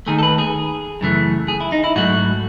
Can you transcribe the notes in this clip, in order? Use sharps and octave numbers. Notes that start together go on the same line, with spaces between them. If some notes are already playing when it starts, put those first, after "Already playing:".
D#2 D#3 A3 G#4
A4
B4
G#4
F#2 C#3 E3 A3
G#4
E4
D#4
E4
G#2 F#3 A3 F#4